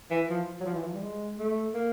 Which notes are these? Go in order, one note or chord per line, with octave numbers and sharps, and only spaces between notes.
E3
F3
F#3
F3
E3
F3
G3
G#3
A3
A#3